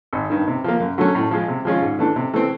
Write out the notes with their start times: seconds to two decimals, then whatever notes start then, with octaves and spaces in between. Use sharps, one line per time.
0.13 G#1
0.30 G2 D#3
0.47 C3
0.64 F3 A#3
0.80 F#2
0.98 D3 F#3 A3 C#4
1.15 A2
1.31 F3 G#3
1.48 C3
1.65 F3 G#3 C#4 F4
1.82 G#2
1.99 E3 A3 D4
2.16 C3
2.33 E3 A3 C4